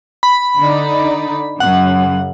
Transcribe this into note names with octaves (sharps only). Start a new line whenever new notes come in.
B5
D3 D#4 D5
F#2 C#3 F#5